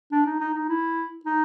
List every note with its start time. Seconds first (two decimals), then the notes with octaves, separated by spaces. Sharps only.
0.12 D4
0.26 D#4
0.40 D#4
0.54 D#4
0.68 E4
1.25 D#4